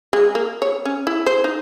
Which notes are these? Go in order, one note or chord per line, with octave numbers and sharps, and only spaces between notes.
G#3
A#3
C#5
C#4
E4
C5
D#4